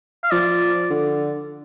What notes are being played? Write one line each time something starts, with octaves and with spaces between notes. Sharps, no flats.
F5
F3 D5
D3